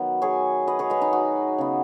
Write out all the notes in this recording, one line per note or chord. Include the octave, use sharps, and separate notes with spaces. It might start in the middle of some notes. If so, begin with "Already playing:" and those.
Already playing: D#3 F#3 B3
G#4 C#5
B4 D#5
G#4 C#5
B4 D#5
D#4
F#4
C#3 B3